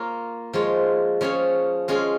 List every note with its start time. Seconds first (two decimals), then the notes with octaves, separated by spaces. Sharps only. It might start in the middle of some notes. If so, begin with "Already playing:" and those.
Already playing: A#3 F4 C#5
0.53 F3 G#3 F4 C#5
1.21 F3 C#4 G#4 C#5
1.88 G#3 C#4 F4 G#4